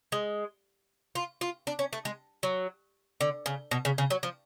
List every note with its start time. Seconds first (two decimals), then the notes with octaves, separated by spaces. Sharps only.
0.12 G#3
1.15 F4
1.41 F4
1.67 D4
1.79 C#4
1.93 A3
2.05 G#3
2.43 F#3
3.21 D3
3.46 C#3
3.71 B2
3.85 C#3
3.98 C#3
4.10 F#3
4.23 F3